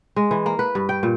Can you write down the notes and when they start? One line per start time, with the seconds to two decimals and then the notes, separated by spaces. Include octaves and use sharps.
0.16 G#3
0.31 E3
0.46 A#3
0.59 B4
0.75 G2
0.89 G5
1.03 A#2